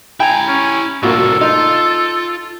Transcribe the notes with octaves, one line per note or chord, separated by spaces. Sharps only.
E4 G5 G#5 A#5
C#4
C2 A2 A#3 F4 F#4 A4
D#4 F4